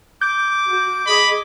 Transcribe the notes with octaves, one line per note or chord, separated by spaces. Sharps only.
D6 G6
F#4
G#4 D#5 B5